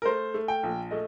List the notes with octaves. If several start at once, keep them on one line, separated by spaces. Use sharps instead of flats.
A#4
A3 C5
A3
G5
A#1
A3 D#5